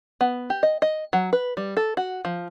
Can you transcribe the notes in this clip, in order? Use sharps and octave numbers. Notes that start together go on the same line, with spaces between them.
B3
G4
D#5
D#5
F#3
B4
G3
A4
F#4
F3